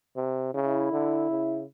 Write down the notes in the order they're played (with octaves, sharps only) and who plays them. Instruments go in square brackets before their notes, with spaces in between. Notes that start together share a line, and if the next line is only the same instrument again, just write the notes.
[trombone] C3
[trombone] C#3 [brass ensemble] E4
[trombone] D3
C#3